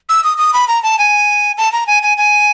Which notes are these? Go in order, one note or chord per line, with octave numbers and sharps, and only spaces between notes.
E6
D#6
D#6
B5
A#5
A5
G#5
A5
A#5
G#5
G#5
G#5